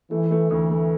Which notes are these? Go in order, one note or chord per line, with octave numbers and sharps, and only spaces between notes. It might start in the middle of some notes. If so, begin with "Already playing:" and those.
E3 A3
A3
D2 E3
A3